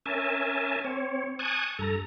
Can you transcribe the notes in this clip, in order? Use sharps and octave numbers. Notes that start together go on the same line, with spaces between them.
C#4 A#4 E5 G#5 A5
C4 C#5
G#5 A5 C#6 D#6 F#6 G#6
G2 A4 A#5